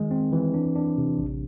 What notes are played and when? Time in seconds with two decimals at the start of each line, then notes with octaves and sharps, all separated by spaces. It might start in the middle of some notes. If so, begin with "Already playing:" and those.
Already playing: D#3 G#3
0.11 C4
0.32 E3
0.54 D4
0.76 D4
0.97 C3
1.18 A1